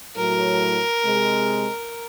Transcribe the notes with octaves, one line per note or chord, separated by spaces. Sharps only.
A2 F#3 A#4
C3 G#3